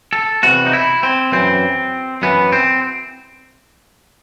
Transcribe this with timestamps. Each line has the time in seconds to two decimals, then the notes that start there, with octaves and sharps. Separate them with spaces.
0.13 A4
0.43 E2 C3 E3 F#4
0.66 D#4
0.73 E4
1.03 C4
1.32 F#2 E3 C4
2.22 F#2 E3 B3
2.52 C4